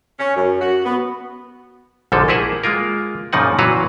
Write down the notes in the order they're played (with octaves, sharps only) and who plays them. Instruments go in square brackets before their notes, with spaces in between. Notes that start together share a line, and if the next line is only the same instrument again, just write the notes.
[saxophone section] C#4
F#2
F#4
B3
[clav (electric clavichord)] A#1 G#2 D3 F3 F#3 A4
A#3 E4 G4 G#4 E5 F#5
G#3 A#3 F4 A#4
F#2 A#2 C#3 F3 D#4 F#5
A#2 E3 F#3 F#4 B4 F5